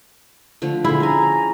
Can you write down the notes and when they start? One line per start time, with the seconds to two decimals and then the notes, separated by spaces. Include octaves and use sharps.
0.62 D3 F3 A3
0.85 D3 E4 G#4 C6
1.00 C#4 G#5 A#5